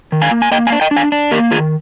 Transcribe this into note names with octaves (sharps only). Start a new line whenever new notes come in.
D#3
F5 G#5
A#3
G#5
A#3 D#5 G5
F5 G#5
D4
D#5 G5
D4
F5 G#5
D4
A#3 G4 A#4
D#3 F4 G#4